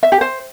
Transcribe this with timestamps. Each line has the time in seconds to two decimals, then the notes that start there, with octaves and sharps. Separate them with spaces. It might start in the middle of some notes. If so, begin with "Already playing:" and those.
0.03 E5
0.12 G4
0.21 C5